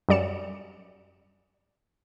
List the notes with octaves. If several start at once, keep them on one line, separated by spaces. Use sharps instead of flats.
F#2 G3 D5 C#7 E7